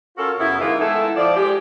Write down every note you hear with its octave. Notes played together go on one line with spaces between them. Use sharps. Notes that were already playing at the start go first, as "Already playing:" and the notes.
C#4 F4 F#4 A4 A#4
F#2 C#3 B3 E4
D#3 E3 G#3 E4 F4
G#3 A3 B3 E4 A4
F3 D5
G#3 G4